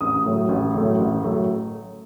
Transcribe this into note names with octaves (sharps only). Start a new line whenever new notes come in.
A1 D#6
A2 F#3 A3
A1
A2 F#3 A3
A1
A2 F#3 A3